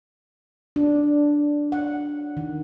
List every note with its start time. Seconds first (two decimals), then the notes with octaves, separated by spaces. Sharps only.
0.76 D4
1.72 F#5
2.37 D#3